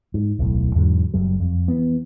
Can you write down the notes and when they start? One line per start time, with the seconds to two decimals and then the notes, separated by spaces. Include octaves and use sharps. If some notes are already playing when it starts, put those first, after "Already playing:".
0.14 G#2
0.39 D1 B1 A2
0.75 E2 G#2 D3 F#3
1.14 F#1 F#2 F#3 G3
1.40 F2
1.68 E3 B3